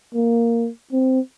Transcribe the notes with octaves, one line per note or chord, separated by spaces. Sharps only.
A#3
C4